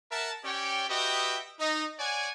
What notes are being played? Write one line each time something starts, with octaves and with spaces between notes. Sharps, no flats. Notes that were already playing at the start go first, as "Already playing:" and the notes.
A#4 E5 F#5 A5
C#4 G4 C#5 D5 G5
F#4 G4 B4 D#5 E5 G5
D#4 D#5
C#5 D5 F#5 G#5